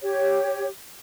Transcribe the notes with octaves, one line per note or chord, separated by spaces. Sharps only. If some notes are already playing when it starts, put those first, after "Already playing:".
G4 C#5